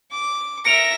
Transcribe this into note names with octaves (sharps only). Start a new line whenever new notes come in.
D6
A#4 E5 A#6 C#7 D7 F7